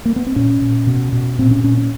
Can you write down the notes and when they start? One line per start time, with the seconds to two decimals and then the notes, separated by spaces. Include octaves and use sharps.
0.05 A#3
0.16 B3
0.26 C4
0.36 A#2 C#4
0.62 A#2
0.87 B2
1.13 B2
1.39 A#2 C4
1.51 C#4
1.64 A#2 C#4
1.77 C#4